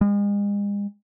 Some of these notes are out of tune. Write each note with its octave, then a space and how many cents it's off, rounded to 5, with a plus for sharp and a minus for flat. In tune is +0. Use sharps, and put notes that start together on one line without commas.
G#3 -40